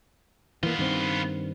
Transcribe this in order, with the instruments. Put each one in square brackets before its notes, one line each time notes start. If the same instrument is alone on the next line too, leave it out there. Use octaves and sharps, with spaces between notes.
[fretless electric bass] E3 A#3 [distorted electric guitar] B3 F4
[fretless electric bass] G2 D#3 C4